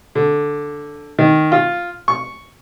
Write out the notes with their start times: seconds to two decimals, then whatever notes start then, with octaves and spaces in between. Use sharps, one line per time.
0.15 D3
1.19 D#3
1.52 F4
2.08 C#6